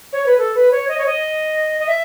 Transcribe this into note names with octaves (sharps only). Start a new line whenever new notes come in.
C#5
B4
A4
B4
C#5
D#5
C#5
D#5
D#5
E5